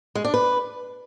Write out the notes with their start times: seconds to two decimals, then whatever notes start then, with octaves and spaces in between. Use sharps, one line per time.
0.15 G#3
0.25 D4
0.34 B4